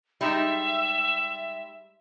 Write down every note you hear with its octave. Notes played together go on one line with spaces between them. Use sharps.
G3 G#3 D#4 E5